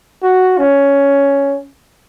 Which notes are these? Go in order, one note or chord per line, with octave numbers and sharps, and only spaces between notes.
F#4
C#4